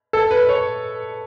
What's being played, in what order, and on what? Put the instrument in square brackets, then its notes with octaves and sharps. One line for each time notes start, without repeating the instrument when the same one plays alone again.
[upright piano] A4
B4
C#5